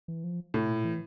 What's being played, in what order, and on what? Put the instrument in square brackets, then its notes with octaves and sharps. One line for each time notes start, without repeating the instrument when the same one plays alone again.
[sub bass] E3
F3
[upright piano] A2 [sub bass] C3
[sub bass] A#2
E3